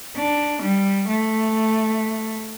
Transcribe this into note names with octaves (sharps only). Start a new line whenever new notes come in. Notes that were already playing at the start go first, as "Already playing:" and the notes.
D4
G3
A3